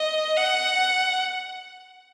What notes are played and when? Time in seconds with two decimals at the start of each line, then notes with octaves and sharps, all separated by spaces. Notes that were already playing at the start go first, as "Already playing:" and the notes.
Already playing: D#5
0.37 F#5